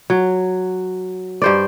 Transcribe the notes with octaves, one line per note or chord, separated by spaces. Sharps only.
F#3
G2 C5 D5